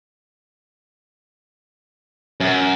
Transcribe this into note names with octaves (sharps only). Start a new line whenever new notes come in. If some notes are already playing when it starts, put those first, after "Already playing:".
F#2